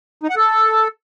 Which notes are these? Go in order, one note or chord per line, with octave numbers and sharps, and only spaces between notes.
D#4
F#5
A4